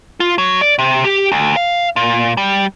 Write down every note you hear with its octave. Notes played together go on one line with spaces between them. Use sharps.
F4
F#3
D5
C3
G4
D2
F5
A#2
G3